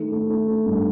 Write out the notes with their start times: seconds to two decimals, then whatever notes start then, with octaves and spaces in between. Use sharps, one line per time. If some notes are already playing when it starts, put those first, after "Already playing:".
Already playing: D#3 A3
0.12 A3
0.29 A3
0.48 A3
0.66 G2